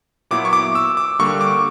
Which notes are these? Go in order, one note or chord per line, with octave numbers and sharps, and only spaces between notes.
A#2 F#3 B3 E4 D6
C#6
D6
E6
D6
D3 G3 A#3 C#6
D6